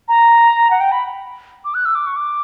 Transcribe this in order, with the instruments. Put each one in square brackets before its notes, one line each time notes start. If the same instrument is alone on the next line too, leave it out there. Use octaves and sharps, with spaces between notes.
[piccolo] A#5
F#5
G5
B5
D6
F#6
E6
D6
C#6
D6